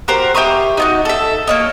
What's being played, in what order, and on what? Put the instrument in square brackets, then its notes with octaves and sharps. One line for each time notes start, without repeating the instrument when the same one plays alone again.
[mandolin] F#4 G4 A#4 C5
G4 E5 C#6 D#6
D#4 F4 F#4
A4 E5
A#3 C#5 D#5